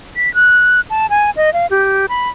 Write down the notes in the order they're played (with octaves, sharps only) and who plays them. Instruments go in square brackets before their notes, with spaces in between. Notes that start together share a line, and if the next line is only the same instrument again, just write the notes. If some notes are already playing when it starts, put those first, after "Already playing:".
[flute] B6
F#6
A5
G#5
D#5
F5
G4
B5